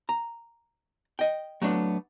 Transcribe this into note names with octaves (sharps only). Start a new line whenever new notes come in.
A#5
D#5 G5
F#3 A3 B3 D4